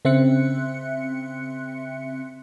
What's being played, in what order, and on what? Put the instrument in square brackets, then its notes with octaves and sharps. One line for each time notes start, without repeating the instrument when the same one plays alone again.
[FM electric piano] C#3 C4 E5 C6 F#6 C#7